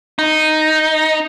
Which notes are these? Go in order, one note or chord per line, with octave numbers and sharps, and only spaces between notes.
D#4